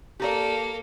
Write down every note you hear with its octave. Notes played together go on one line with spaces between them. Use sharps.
A#3 G4 A4 A#4 D5